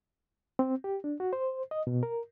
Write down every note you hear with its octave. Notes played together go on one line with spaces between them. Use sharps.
C4
G4
D4
F#4
C5
D#5
B2
A#4